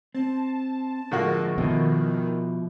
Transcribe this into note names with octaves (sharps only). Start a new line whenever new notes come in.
C4 A5
A2 D3 F3 G#3 A#3 F#4
B2 D#3 F3 E4